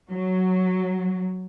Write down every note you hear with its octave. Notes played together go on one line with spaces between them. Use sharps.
F#3